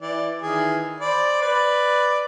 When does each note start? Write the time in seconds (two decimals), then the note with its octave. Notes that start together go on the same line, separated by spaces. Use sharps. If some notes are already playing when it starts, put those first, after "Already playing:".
0.01 E3 D5
0.42 D#3 E3 G#4
1.00 C5 D5 B5
1.42 B4 D5